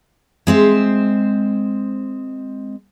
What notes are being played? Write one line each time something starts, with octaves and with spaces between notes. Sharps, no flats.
G#3 C4 C5 E5